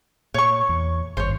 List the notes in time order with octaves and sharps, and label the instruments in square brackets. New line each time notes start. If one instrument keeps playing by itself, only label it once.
[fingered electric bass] A#2 [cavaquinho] C#5 C#6
[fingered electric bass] E2
[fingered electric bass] G#1 G2 D#3 [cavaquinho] C5 C#5